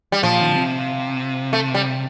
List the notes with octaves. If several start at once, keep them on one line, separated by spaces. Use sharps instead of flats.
G3
A#2 F3
D#3
D3
C3
A3
G3